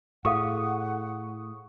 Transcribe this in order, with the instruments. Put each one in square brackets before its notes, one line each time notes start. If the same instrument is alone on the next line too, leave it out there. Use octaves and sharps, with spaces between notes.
[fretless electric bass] A2 [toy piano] G#4 A4 F5 [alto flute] F#5 [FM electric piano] C#6 D#6